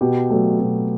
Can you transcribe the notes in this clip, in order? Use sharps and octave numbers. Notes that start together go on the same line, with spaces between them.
B2 G4
F#3 A3
B2